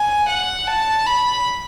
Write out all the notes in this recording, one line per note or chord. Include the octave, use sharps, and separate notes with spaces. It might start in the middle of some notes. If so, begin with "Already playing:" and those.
Already playing: G#5
F#5
A5
B5